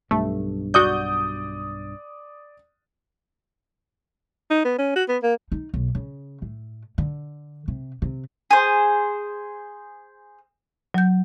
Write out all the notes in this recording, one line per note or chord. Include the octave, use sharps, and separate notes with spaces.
B1 G2 A3
F#4 D5 D#6 G6
D#4
B3
C#4
F#4
B3
A#3
D#4
B1
C#3
A2
D3
C3
C3
G#4 C5
F#3 G6